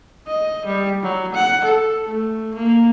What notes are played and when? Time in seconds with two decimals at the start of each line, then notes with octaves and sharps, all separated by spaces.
0.27 D#5
0.66 G3
1.03 F#3
1.34 F#5
1.64 A4
2.07 A3
2.54 A#3